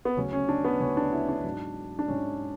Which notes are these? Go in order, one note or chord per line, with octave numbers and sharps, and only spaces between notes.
B3
D2 C#3 F#3 C#4
C#4
D4
B3
D2 C#3 F#3 C#4
D4
E4
D4
G#2 F#3
D4
G#2 F#3 C#4